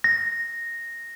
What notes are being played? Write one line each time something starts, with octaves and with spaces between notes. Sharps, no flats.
A#6